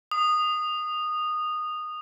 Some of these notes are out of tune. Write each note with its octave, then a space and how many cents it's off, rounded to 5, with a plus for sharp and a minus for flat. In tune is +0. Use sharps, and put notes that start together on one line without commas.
D#6 -15